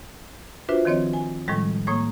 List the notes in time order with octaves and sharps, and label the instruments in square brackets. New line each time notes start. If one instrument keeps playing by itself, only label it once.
[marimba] D4 F4 F#4 B4 C5 E5
D#3 F3 C4 C#5 D#5
G#5
A2 D#3 F3 G3 G#3
A2 A#3 C#5 D#6 G#6